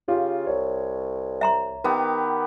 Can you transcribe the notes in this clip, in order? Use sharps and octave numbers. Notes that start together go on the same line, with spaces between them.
C#3 F4 G4
C2 C#5
E5 A#5 C6
D#3 B3 G4 A#4